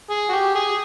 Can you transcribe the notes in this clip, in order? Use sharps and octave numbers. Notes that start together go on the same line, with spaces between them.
G#4
F#4
G4
G#4